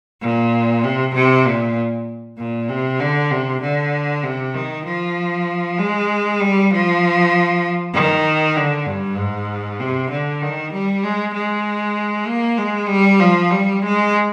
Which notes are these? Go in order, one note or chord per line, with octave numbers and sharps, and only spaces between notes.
A#2
C3
C3
A#2
A#2
C3
D3
C3
D3
C3
D#3
F3
G#3
G3
F3
D#3
D3
G2
G#2
C3
D3
D#3
G3
G#3
G#3
A#3
G#3
G3
F3
G3
G#3